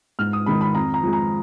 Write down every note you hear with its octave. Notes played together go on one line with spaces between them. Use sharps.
G#2 F6
D#6
D#3 G#3 B5
B5
F2 A#5
A#5
F3 G#3
A#5